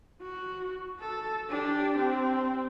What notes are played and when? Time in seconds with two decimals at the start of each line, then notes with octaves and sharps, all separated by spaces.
0.22 F#4
1.00 A4
1.49 D4 G4
1.98 C4